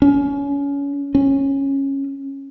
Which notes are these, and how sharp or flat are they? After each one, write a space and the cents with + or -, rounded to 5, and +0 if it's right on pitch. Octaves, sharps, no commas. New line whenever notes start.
C#4 +25
C#4 -15